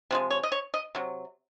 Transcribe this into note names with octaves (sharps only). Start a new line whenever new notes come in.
C3 F3 G#3
C#5
D#5
C#5
D#5
C3 F#3